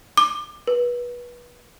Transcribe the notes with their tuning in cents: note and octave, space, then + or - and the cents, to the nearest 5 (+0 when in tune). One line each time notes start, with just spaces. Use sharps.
D6 +25
B4 -25